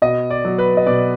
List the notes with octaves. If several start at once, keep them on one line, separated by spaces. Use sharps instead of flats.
B2 D#5
D5
F#3
B4
D#5
B2 D5